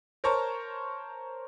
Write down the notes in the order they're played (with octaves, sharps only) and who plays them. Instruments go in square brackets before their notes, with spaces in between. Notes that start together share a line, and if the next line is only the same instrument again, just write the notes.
[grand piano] A#4 C5 C#5 A5 A#5 C#6